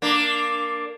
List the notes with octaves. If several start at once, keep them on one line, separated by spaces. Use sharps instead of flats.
A#3 D4